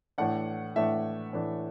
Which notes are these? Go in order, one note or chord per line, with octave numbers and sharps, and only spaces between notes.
A2 E3 A3 D4 F#5
A2 E3 A3 D4 E5
A2 E3 A3 D4